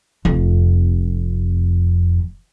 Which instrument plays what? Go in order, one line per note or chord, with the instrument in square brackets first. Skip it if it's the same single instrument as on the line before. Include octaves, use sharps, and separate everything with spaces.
[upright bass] F1 F2